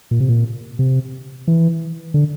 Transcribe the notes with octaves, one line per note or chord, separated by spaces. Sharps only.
A#2
C3
A#2
C3
E3
D3